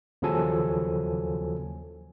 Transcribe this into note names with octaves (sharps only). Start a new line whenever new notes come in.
D#2 C#3 F3 F#3 A4 G#5